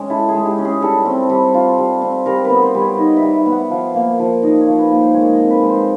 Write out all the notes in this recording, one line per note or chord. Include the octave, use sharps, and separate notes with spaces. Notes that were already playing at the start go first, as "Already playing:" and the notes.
Already playing: G#3 C#4
E4 A4
G#4
G#3
G4
C#4
G#4
G3 A4
C4
G3
F4
G3
C4
G3 A#4
B3 B4
C5
G3
C#5
D#4 D#5
E5
G3
E5
B3
F#5
F3 F5
A#3 F5
F3
D#4 D5
C#5
F3
B4
A#3
C5
G#3 C#5
D#5
C4
B4
G#3
C5